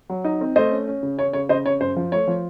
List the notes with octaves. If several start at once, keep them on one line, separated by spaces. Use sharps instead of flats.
F#3
D#4
C4
A3 C5 D#5
C#4
C#4
C#3
C#4 C#5
C#3 C#5
C#3 C5 D#5
C#3 C#5
F#2 C5
F3
A3 C#5
F3